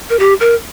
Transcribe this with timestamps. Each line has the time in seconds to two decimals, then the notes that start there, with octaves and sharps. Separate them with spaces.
0.10 A#4
0.19 G4
0.40 A#4